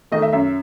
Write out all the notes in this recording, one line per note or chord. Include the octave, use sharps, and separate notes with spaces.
D#3 A3 D#5
E5
F#2 E5